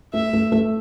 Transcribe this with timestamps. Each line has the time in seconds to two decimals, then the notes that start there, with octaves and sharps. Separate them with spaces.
0.14 A3 E5
0.33 A3
0.52 A3